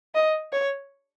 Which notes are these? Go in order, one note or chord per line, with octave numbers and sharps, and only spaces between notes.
D#5
C#5